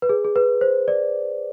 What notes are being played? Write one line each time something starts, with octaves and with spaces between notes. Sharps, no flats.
B4
G#4
G#4
B4
C5
D5